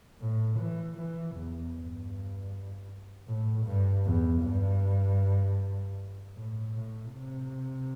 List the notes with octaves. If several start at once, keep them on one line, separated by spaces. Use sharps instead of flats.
A2
E3
E3
E2
G2
A2
G2
E2
G2
A2
A2
C3